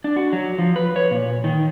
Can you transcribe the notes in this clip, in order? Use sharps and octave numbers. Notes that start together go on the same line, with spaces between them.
D4
F#4
F#3
F3
B4
C#5
A#2
D#3